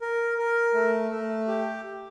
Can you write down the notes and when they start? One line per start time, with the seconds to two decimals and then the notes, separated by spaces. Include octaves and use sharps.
0.01 A#4
0.38 A#4
0.74 A3
1.11 A3
1.48 G4